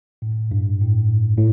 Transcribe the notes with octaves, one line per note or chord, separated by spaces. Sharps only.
A2
G2
A2
A2